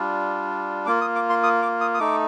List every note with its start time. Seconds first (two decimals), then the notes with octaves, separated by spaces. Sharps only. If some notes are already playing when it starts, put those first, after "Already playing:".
Already playing: G3 D4 F4
0.86 A#3 F4 D6
1.01 D#6
1.15 D6
1.30 C6
1.43 D#6
1.62 D6
1.81 D#6
1.94 D#6
1.99 A3 D#4 D6